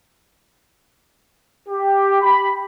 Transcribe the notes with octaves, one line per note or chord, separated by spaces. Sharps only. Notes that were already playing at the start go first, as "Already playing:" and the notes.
G4
B5